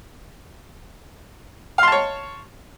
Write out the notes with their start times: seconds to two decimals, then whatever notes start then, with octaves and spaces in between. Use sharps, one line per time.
1.78 F5
1.83 C6
1.87 A5
1.92 C#5